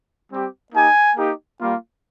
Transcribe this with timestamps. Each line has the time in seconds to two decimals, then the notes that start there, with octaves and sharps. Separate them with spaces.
0.31 G3 C4 G4
0.73 A#3 D#4 G4 G#5
1.16 A#3 D#4 G4
1.59 G3 A#3 F4